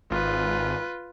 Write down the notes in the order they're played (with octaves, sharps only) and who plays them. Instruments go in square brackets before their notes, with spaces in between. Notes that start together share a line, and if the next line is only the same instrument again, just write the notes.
[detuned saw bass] G#1 [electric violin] F4 B4